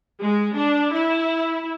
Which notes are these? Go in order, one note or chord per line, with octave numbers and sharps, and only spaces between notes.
G#3
D4
E4